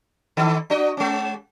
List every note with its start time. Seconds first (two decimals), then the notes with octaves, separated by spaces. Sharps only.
0.37 D#3 D#4 A4
0.70 D4 F#4 D#5
0.97 G#3 C#4